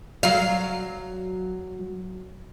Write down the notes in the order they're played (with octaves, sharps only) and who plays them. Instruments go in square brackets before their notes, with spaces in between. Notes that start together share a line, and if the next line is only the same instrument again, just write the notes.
[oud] F#3 F5